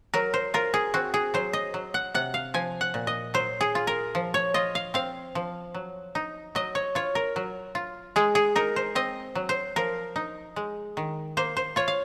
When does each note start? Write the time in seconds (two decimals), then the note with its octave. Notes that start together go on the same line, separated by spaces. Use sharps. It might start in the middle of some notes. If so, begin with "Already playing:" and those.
0.14 F#3 A#4
0.34 C5
0.54 F4 A#4
0.74 G#4
0.94 C4 F#4
1.14 G#4
1.34 F#3 C5
1.53 D#5
1.74 F#3
1.94 F#5
2.14 C3 F#5
2.34 F5
2.54 F3 G#5
2.81 F#5
2.94 A#2
3.07 D#5
3.34 F#3 C5
3.61 G#4
3.75 F4
3.87 A#4
4.15 F3
4.34 C#5
4.54 F4 D#5
4.75 F5
4.94 C4 F5
5.35 F3
5.75 F#3
6.15 D#4
6.55 F#3 D#5
6.75 C#5
6.95 F4 C#5
7.15 A#4
7.36 F#3
7.75 F4
8.16 G#3 G#4
8.35 G#4
8.56 D#4 A#4
8.76 C5
8.95 C4 D#5
9.35 F#3
9.49 C5
9.76 F3 A#4
10.16 D#4
10.56 G#3
10.97 D#3
11.37 A#3 C5
11.57 C5
11.76 F4 C#5
11.88 F5